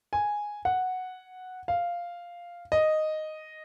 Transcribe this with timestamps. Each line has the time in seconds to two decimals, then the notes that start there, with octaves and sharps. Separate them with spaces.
0.13 G#5
0.65 F#5
1.68 F5
2.72 D#5